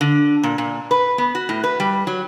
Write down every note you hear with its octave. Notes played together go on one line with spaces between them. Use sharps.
D3
A#2
A#2
B4
B3
F#4
A2
B4
G3
F#3